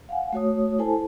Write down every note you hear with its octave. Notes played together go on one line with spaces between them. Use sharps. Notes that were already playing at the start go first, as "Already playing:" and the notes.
F5 F#5 G#5
A3 F#4 C#5 D#6
E4 A4 C5 G#5 A5